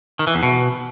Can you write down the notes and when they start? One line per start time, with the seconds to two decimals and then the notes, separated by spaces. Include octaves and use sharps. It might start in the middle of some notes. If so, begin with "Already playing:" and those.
0.19 D#3
0.27 E3
0.35 E2
0.43 B2